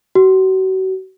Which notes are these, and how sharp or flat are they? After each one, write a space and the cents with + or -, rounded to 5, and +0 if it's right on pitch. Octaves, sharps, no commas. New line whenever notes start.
F#4 +35